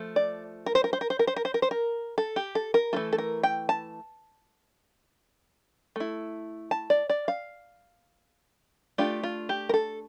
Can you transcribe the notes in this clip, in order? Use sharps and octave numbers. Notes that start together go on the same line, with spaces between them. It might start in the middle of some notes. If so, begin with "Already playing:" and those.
Already playing: F3 A3
D5
A#4
C5
A#4
C5
A#4
C5
A#4
C5
A#4
C5
A#4
C5
A#4
A4
G4
A4
A#4
E3 A3 C4 F4 A4
A4
A#4
G5
A5
A3 E4
A5
D5
D5
F5
A3 D4 F4 G4
F4
G4
A#4
A4